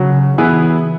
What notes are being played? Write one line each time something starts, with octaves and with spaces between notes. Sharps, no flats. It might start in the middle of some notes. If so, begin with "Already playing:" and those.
Already playing: C#3 F#3
E3 B3 E4 G#4 B4